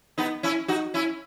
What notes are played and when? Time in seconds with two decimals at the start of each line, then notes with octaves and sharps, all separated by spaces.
0.18 B3 D#4
0.43 C#4 E4
0.68 D#4 F#4
0.94 C#4 E4